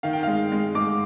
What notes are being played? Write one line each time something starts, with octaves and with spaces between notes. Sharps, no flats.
D#3 F5
G5
G#3 F5
G#3
G#3 D6